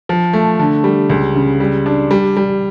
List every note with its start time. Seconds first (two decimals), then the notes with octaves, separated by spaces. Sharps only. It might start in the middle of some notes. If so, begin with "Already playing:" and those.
0.09 F3
0.33 A3
0.59 D3
0.84 G3
1.10 C#2
1.35 C#3
1.60 G3
1.86 D4
2.11 G3
2.37 G3